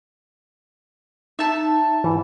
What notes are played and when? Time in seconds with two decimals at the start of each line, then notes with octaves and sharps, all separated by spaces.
1.39 D#4 E5 A5
2.04 G#2 E3